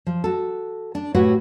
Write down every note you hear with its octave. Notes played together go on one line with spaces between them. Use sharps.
F3
F#4 A4
D4
A2 F#4 G4 B4 C#5 F#5